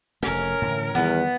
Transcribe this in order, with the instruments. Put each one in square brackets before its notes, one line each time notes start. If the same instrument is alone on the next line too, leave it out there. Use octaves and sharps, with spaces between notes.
[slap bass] F1 A3 [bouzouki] C#4 [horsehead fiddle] A#4
[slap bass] A2 D3 E3
[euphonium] E2 [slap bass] D#3 G3 [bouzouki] B3